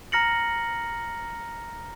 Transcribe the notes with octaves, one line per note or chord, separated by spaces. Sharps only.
A#5 F6 A#6 C#7 F#7